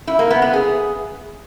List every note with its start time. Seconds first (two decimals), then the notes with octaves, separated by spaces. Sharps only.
0.07 E4
0.19 A#3
0.30 B3
0.42 B3
0.53 G#4